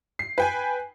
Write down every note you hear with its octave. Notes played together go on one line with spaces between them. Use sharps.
C7
B4 G5 G#5